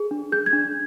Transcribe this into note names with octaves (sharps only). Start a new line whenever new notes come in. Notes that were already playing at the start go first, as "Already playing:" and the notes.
Already playing: G#4
D4
G#4 G6
G#6
D4